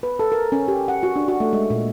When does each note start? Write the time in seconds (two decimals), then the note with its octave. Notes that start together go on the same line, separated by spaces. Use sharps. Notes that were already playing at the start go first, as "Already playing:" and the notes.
0.03 B4
0.19 A4
0.32 A#4
0.52 C#4
0.68 G4
0.88 F#5
1.03 F#4
1.16 D4
1.28 F#4
1.40 A3
1.53 G#3
1.70 A#2